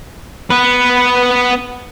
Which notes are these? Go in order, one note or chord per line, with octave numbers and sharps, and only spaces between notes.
B3 B4